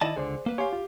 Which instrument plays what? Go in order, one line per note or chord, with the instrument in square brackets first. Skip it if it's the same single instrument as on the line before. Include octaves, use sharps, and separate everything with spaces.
[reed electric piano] D#3 E4 [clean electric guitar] D5 D#5 A5
[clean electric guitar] C#2 D3 [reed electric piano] G#4 C5 D5
[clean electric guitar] A#3 B4
[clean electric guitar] G4 F5 [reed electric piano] C#5 G#5 C6
[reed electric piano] F4